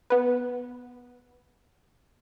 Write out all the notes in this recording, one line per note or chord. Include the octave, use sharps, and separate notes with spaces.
B3 B4